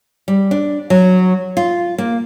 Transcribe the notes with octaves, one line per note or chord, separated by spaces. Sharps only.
G3
D4
F#3
F4
A#3